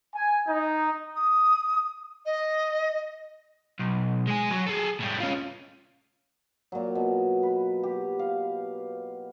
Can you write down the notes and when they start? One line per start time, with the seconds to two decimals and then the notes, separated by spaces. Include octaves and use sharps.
0.14 G#5
0.47 D#4
1.15 D#6
2.25 D#5
3.79 B1
4.27 G#3 G#5
4.51 F#3
4.66 G#4 A4
5.00 A2 G3
5.20 C#4 F4
6.72 A#2 F#3
6.95 B2
7.43 B4
7.83 G4
8.19 F5